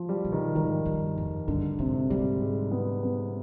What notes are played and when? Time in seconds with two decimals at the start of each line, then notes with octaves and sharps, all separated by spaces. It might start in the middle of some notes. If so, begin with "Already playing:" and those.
Already playing: F3
0.09 G3
0.25 B2
0.32 D#3
0.55 G#2 D#3
0.85 G2
1.18 F2
1.48 G2 D3
1.79 G#2 C3
2.10 G#2 G3
2.41 G#3
2.71 B3
3.03 B3